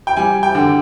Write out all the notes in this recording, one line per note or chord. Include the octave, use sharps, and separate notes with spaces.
G5
G3 G#5
G5
D3